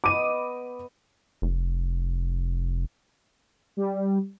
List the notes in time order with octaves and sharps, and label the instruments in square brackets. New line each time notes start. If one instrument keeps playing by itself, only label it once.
[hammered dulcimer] B3 D#5 B5 [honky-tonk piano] D6 D#7
[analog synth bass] F1
[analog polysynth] G3